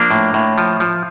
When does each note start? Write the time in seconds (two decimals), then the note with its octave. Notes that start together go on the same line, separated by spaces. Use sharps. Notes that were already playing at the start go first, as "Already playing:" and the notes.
Already playing: F3 A#3 D4
0.11 A2
0.34 A2
0.58 F3
0.80 F3